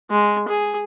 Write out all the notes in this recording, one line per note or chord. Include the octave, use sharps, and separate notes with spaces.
G#3
G#4